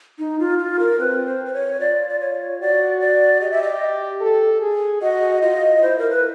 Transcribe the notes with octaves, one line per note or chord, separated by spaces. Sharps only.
D#4
F4
F4
A#4
C4 B4
C5
C5
C#5
F4 D5
D5
C#5
F#4 D5
D5
G4 D#5
E5
D#5
A4
G#4
F#4 D#5
F4 D#5
E4 C5
A#4
B4